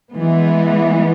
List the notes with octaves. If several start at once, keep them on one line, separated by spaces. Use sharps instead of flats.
E3 G#3 B3